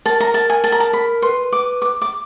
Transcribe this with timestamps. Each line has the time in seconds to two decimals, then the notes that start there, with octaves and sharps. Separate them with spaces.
0.06 A#4 A5
0.20 A#5
0.34 A5
0.50 G#5
0.64 A5
0.72 A#5
0.80 A5
0.93 B5
1.22 B4 C6
1.52 D6
1.82 D6
2.02 D6